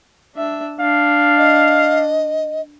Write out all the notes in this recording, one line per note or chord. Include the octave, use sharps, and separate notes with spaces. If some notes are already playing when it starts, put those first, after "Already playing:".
D4 E5
D4 F5
D#5